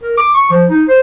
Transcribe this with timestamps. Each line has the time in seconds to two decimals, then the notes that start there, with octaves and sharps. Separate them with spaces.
0.03 A#4
0.17 D6
0.34 C#6
0.50 F3
0.69 D#4
0.88 C5